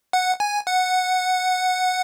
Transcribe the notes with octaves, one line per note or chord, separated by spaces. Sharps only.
F#5
G#5
F#5